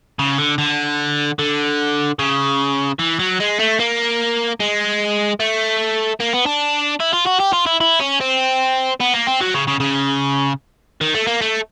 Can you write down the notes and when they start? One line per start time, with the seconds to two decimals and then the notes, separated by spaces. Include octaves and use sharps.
0.19 C#3
0.38 D3
0.58 D3
1.39 D3
2.19 C#3
2.99 E3
3.19 F#3
3.40 G#3
3.59 A3
3.79 A#3
4.60 G#3
5.40 A3
6.20 A#3
6.33 B3
6.46 D4
7.00 E4
7.13 F4
7.27 F#4
7.40 G4
7.53 F4
7.67 E4
7.81 E4
8.00 C#4
8.21 C4
9.00 B3
9.14 A#3
9.27 C4
9.41 F#3
9.54 C#3
9.68 C#3
9.80 C#3
11.01 D#3
11.15 A3
11.27 A#3
11.41 A3